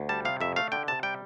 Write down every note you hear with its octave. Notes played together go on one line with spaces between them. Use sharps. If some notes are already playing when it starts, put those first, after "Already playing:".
Already playing: D2
G3 A5
C3 F5
F2 E5
A3 F5
D3 G5
C3 A5
G3 G5